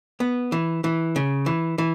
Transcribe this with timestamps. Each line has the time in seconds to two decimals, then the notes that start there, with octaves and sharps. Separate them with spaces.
0.20 B3
0.52 E3
0.84 E3
1.16 C#3
1.46 E3
1.78 E3